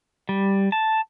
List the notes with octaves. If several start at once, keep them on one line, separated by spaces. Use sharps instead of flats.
G3
A5